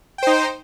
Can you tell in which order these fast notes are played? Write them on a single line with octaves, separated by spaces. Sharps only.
G5 C5 D#4